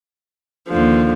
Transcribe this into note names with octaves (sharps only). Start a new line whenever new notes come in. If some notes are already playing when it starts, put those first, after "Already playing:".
D#2 D3 F3